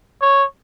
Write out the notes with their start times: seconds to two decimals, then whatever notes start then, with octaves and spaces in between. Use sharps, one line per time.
0.21 C#5